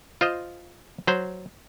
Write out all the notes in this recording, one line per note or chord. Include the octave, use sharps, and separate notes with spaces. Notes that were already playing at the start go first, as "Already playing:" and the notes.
F4 C5 D#5
F#3 C5